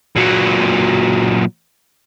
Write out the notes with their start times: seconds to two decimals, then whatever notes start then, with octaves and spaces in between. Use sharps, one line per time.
0.16 A#2 F#3